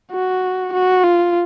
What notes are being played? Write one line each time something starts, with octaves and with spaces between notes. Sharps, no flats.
F#4
F#4
F4